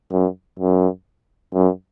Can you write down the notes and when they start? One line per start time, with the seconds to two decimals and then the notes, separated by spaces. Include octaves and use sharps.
0.12 F#2
0.59 F#2
1.54 F#2